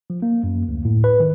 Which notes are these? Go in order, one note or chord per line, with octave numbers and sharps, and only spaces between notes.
F3
A#3
F#2
D2
A2
B4
D#3